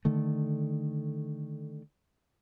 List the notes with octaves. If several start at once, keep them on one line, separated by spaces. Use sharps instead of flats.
D3 D#3 A3